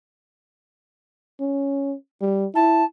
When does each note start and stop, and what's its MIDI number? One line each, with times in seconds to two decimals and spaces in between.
1.40 1.95 61
2.21 2.46 55
2.55 2.84 64
2.55 2.84 81